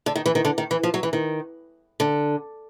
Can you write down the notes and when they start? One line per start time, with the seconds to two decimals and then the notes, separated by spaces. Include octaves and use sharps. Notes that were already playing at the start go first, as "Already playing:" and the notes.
0.06 D3
0.16 D#3
0.26 E3
0.35 D#3
0.45 D3
0.58 D#3
0.71 E3
0.83 F3
0.94 F#3
1.03 E3
1.13 D#3
2.00 D3